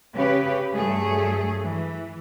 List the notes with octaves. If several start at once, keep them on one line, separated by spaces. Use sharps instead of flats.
C#3 G4 B4
G2 F#3 A3 G#4
E3